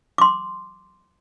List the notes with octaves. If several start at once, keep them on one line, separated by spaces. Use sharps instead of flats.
C6 D6